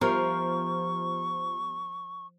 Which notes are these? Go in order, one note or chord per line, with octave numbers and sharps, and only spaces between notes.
F3 B3 G4 A#4 C#6 F6